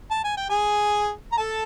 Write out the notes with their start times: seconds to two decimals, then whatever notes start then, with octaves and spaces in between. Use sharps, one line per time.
0.11 A5
0.24 G#5
0.37 G5
0.50 G#4 G#5
1.32 A#5
1.38 A4 A5